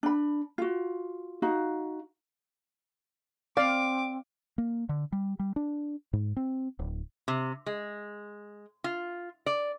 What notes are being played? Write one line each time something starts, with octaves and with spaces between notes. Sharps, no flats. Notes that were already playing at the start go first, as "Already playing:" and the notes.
D4 B5
F4 F#4
D#4 F#4 F5
C4 D5 F5 D6
A#3
D3
G3
G3
D4
G#2
C4
D1
C3
G#3
F4
D5